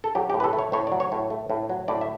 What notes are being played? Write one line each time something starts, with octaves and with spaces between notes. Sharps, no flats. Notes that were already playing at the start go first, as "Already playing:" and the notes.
A4
F#3 G4
A2 G4
B4
A4
A3
C#5
A2 C#5
F#3 D5
C#5
A2
A3
A2
F#3
A2 D5
E5